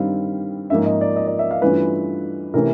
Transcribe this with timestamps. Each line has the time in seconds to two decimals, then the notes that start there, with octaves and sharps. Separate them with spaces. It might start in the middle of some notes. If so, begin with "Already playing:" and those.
Already playing: G2 D#3 G3 C4 F5
0.70 G#2 F3 A#3 C#4 F4 E5
0.86 D#5
1.01 D5
1.16 D#5
1.27 D5
1.39 E5
1.51 F5
1.62 G2 E3 A3 C#4 F4 B4
2.54 C3 E3 A3 C#4 E4 A#4